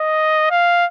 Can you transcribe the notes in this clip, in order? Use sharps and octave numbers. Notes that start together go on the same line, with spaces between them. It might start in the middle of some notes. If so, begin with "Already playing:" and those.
Already playing: D#5
F5